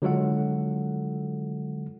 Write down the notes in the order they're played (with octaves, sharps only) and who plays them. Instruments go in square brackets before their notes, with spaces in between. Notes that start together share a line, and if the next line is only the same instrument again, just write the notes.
[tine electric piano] D3 F#3 G#3 F4 A4 F#5